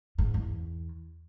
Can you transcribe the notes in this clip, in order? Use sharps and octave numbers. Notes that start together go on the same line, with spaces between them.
G#2
E2